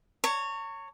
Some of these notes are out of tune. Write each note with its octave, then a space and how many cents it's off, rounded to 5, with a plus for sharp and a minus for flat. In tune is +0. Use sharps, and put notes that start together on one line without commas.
C#5 +0 A#5 -45